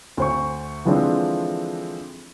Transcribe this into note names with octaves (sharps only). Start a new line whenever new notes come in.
D2 C5 C#6
D3 E3 F3 G#3 C4 D4